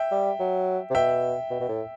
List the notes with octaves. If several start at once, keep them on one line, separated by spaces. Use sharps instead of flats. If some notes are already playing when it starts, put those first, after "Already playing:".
Already playing: E5 G5
G3
F#3
C3
B2 E5 G5
B2
B2
A2